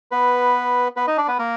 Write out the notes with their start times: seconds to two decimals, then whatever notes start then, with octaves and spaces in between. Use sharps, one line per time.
0.11 B3 B4
0.96 B3 B4
1.07 D#4 D#5
1.17 D4 D5
1.28 B3 B4
1.39 A#3 A#4